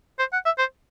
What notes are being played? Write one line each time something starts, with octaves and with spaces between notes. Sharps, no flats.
C5
F#5
E5
C5